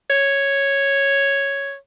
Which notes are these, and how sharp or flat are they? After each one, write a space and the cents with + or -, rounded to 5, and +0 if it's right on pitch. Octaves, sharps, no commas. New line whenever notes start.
C#5 +0